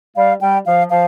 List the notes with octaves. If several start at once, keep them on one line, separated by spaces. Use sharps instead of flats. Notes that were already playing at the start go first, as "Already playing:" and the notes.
G3 F5
G3 G5
F3 F5
F3 F5